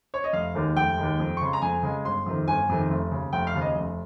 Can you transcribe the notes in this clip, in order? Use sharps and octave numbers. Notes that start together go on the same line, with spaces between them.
C#5
D#5
F1 F5
D#2 D#3 G#3
F1 G5
D#2 D#3 G#3
F2
C#6
C#3 G#3 C6
A#5
F2 G#5
C#3 G#3
G1 C6
F2 C3 D#3
G1 G#5
F2 C3 D#3
F1
D#2 C#3
F1 G5
F5
D#2 C#3
D#5
F1